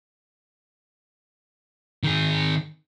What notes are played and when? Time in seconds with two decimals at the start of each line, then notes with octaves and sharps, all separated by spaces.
2.03 D#3 G#4